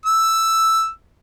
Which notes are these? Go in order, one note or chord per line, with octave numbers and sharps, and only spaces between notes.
E6